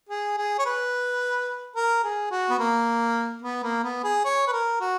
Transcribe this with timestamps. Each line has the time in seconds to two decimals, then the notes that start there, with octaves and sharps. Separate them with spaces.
0.09 G#4
0.38 G#4
0.59 C#5
0.66 B4
1.76 A#4
2.04 G#4
2.31 F#4
2.50 B3
2.59 A#3
3.42 B3
3.63 A#3
3.83 B3
4.04 G#4
4.25 C#5
4.47 B4
4.52 A#4
4.80 F#4